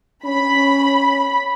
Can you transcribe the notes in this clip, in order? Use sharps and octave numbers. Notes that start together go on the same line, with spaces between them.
C#4 B5